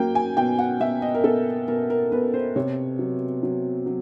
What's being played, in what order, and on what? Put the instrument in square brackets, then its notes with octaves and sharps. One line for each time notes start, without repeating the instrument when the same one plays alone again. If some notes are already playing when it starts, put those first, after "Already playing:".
Already playing: [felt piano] F#3 A#3 G5
G#5
B2 G5
F#5
B2 E5
D#5
A#4
B2 A4
B2 A#4
A#4
B2 B4
C5
C3 C#5
F#3
F#3
F#3